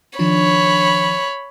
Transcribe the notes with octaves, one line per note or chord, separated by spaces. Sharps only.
D#3 F3 D4 C#5 B5